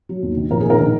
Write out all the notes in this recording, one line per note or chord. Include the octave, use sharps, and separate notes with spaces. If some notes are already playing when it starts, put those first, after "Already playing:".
F#3
D#2
D#3
A#1 A#4
G#4
D#3 A#4
D#3